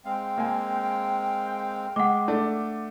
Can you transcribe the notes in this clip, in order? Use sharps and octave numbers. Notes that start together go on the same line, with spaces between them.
G#3 C4 F5 G5
A#3 G#5
G#3 F#5 D6
A3 D4